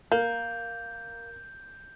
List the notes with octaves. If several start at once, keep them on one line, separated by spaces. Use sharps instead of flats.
A#3 A#4 G6